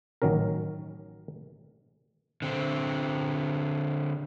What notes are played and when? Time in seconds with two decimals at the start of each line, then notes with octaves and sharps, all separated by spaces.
0.22 A1 D#3 F#3 C#4 A#4
2.42 D3 C4